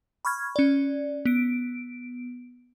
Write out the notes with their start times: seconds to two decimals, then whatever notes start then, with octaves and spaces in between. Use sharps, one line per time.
0.25 B5 C#6 F6 G#6
0.56 C#4 D5
1.25 B3 D7